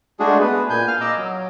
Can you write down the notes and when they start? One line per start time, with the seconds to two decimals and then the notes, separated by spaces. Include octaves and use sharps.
0.20 G#3 A3 D4 F#4 G#4
0.41 B3 B4
0.70 A#2 G#5 G6
0.88 F5 F6
1.01 D#5 A#5 D6 E6
1.17 F#3